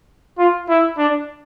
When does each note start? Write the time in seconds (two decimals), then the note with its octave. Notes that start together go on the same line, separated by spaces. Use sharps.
0.39 F4
0.69 E4
0.98 D4